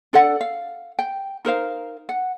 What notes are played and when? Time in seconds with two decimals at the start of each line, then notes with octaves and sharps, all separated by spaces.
0.13 D4 A4 D5 F#5
0.41 F5
0.99 G5
1.45 D#4 A#4 C5 F5
2.09 F#5